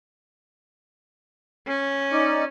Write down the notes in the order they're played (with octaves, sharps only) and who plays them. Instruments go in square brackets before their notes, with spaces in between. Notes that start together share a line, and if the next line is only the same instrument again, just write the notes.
[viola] C#4
[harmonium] D#4 D5